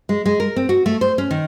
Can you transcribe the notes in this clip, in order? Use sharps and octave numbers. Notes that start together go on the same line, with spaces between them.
G#3
G#3
A#4
C4
F#4
A3
C5
C#4
D#3